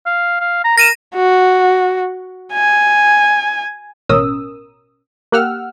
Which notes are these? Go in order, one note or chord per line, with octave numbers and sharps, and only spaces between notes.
F5
F5
A#5
A#4 A#6 D#7 E7
F#4
G#5
A1 B2 C#4 A#4 D#6 E6
A#3 G4 F#5 E6 F6